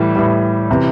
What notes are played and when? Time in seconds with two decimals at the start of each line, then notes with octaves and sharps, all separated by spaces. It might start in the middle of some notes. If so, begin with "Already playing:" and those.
Already playing: A2 E3 G3
0.16 A2 E3 G3
0.71 C3 E3